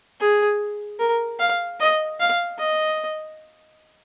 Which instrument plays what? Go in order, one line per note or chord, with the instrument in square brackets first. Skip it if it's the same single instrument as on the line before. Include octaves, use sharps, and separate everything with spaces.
[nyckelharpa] G#4
A#4
F5
D#5
F5
D#5